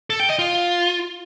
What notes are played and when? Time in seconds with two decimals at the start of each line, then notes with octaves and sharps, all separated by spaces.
0.10 A4
0.20 G5
0.29 D#5
0.39 F4